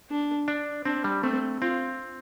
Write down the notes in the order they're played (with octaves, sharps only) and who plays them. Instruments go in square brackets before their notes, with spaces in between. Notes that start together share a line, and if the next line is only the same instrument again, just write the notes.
[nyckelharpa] D4
[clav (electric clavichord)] D4
[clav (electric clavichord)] C4 [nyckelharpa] D4
[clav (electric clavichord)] G3
[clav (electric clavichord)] A3 [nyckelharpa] C4
[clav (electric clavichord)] C4 [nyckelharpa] F4